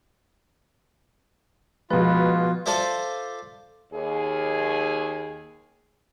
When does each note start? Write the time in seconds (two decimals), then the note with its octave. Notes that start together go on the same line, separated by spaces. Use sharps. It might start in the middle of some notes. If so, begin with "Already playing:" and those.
1.91 B2 F3 G#3 F4 B4
2.66 F4 A4 C5 D5 E5
3.93 D#2 G#4